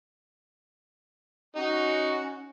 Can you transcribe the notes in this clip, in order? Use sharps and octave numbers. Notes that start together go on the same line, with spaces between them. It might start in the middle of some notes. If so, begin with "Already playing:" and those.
C#4 D#4 F#4